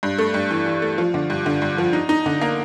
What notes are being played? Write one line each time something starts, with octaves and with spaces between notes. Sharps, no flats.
G2
A3
G2
E3
E3
A3
F3
D3
G2
D3
G2
F3
D#4
D#4
D3
A#3